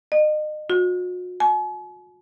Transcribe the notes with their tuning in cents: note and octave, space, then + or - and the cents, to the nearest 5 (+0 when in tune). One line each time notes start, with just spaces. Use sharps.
D#5 -35
F#4 -40
G#5 +45